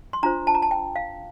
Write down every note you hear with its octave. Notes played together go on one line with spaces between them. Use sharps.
C6
D4 F4 C5 A#5
A5
A#5
A5
G5
F5